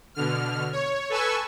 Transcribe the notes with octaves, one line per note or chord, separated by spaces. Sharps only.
B2 D3 F6
C#5
A4 B4 G#5 C#6 E6